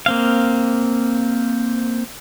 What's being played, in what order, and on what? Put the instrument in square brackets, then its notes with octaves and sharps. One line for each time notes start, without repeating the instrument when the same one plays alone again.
[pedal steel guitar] A#3 C4 F5